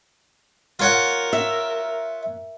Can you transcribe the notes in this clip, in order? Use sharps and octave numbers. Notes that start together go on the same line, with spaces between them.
F4 A#4 C#5 F#5
E5